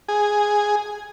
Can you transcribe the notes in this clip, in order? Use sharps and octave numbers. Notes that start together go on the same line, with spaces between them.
G#4